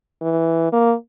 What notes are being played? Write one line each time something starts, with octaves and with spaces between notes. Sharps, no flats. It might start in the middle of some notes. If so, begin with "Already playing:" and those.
E3
A#3